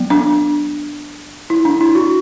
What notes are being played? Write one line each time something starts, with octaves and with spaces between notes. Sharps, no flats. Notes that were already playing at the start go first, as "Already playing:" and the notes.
Already playing: F#3 B3
D4
E4
D4
E4
F#4